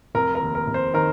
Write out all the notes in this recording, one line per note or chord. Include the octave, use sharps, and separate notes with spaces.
F1 A#4
A#4
D#2
A#4
F1
C5
D#3 A#4